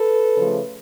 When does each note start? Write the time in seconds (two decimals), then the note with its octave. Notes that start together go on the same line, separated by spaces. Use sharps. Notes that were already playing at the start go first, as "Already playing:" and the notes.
Already playing: A4 B4
0.37 C#3 F3 A3